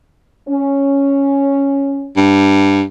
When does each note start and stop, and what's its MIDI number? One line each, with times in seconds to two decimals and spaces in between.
0.49 2.11 61
2.17 2.83 43